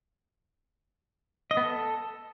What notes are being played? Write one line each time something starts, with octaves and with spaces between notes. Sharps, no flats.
D#5
B3
A4